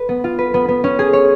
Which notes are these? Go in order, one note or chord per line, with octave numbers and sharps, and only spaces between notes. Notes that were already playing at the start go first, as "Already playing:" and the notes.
Already playing: B4
B3
F4
B4
B3
B3
C#4
G#4
C#5